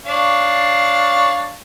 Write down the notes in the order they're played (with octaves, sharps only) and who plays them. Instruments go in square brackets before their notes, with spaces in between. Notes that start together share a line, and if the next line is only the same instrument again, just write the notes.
[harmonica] D4 C#5 F5